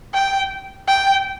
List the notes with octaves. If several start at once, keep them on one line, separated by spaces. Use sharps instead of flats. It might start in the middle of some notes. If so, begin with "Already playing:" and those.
G5
G5